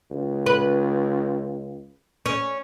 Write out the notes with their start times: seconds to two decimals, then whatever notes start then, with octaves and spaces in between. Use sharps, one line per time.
0.11 C#2
0.46 B4
2.26 C#4